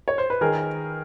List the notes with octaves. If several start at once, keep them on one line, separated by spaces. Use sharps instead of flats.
C#5
C5
B4
D#3 G#4 A#4